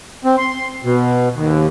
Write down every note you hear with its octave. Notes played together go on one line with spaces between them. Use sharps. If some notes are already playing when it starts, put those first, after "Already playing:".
C4
C6
B2
D#2